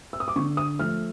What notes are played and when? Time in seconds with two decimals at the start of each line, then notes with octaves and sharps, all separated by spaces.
0.13 E6
0.20 D#6
0.28 D6
0.36 D3 C#6
0.57 D#6
0.79 F3 A3 F6